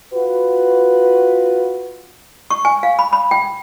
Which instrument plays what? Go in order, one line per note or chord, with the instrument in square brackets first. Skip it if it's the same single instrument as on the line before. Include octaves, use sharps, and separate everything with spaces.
[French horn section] F4 F#4 B4
[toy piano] C#6
G#5
F5
B5
B5
G5